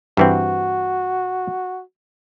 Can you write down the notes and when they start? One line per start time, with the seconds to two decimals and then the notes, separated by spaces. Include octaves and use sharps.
0.17 G2 E3 C4 F#4